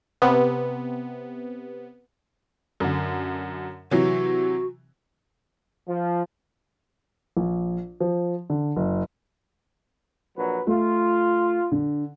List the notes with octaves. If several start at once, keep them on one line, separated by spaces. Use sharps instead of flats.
C3 B3
F#2 D3
C3 E3 F#3 F#4
F3
A#1
F3
D3
F#1
A#1 F#3 B4
A3 F4
D3